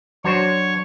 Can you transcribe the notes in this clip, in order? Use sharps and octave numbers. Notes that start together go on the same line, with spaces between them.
F#3 D4 F#4 C5 C#5